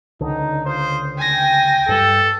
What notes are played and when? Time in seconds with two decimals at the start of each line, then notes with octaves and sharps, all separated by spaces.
0.21 C#2 D3 D#4
0.65 F4 C5 D#6
1.18 G5 G#5 A#6
1.89 G2 G3 A4